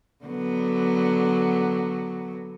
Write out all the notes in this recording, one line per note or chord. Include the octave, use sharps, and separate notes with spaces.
D3 F#3 B3